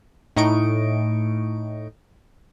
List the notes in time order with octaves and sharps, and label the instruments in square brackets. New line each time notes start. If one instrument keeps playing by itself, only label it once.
[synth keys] A2 D#4 D#5 C#6 D7